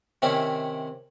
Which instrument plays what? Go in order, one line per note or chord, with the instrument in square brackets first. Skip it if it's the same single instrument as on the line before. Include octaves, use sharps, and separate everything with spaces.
[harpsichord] C3 D#3 C4 C#4 E4